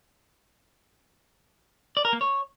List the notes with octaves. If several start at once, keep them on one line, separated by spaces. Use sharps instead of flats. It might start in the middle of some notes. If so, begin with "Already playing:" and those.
D5
A#4
A#3
C#5